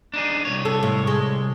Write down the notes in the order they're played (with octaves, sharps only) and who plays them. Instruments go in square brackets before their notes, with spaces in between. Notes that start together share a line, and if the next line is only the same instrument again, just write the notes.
[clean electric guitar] D4 D#4 G#4
C2 C3 C#5
[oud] A4
A2
G#3